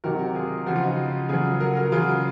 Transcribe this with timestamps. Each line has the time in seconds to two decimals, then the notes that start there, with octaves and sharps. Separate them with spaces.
0.04 C3 D#3 F#3 F#4 A#4
0.35 F4 G#4
0.66 C#3 F3 F#4
0.76 F4
0.83 D#4 F#4
1.29 C#3 F#3 F4 G#4
1.60 F#4 A#4
1.77 F#4 A#4
1.92 C#3 F#3 F4 G#4